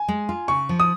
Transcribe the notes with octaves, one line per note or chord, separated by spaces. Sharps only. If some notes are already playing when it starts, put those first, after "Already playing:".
Already playing: G#5
G#3
F4
C#3 C#6
F3
D#6